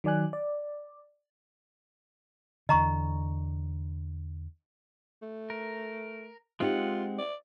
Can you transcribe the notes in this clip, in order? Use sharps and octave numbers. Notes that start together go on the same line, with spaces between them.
D#3 F#3 D5 G#5 F#6
D5
E2 D3 D#5 A#5 C#6
A3
A#4
G#3 C4 D#4 F4 G4 F#5
D5